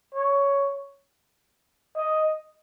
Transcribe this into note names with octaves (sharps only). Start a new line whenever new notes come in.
C#5
D#5